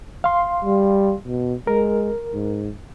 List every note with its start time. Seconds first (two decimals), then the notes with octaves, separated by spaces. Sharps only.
0.24 F5 C6
0.65 G3
1.27 B2
1.67 G#3 A#4
2.33 G#2